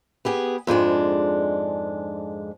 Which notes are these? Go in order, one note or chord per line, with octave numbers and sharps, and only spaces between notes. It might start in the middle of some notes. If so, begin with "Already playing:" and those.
B3 G4 G#4
F2 G#2 G#3 D4